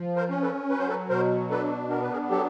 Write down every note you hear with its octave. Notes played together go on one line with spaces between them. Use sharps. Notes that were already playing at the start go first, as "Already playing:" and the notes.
Already playing: F3
A#4 C5
C#4
A4 B4
F#3 B4
C5
A4 B4
B2 A#4 C5
D4 A4 B4
B3 A#4
B4
G#4 A#4
F#3 G4 A4